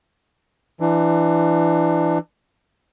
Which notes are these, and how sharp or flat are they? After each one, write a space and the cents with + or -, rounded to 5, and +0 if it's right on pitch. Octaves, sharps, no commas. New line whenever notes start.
E3 +25 D4 +25